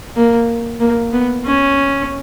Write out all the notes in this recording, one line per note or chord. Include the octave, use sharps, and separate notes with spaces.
A#3
A#3
B3
C#4